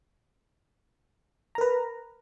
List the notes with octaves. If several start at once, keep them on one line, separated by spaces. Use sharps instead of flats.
A#4 B4 A#5